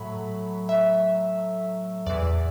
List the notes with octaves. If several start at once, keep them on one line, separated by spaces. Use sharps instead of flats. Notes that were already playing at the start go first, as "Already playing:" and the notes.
Already playing: A2 F#3 B5
E5
E2 E3 D5